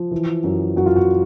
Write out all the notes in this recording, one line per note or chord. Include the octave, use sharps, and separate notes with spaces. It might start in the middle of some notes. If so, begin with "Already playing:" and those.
Already playing: F3
E3
F#2
F#2 F#4
F4
F#4